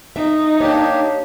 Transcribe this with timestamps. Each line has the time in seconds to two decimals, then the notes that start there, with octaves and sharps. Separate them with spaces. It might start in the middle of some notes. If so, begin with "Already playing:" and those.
0.16 D#4 E5
0.60 A#3 D4 G4 C#5 A5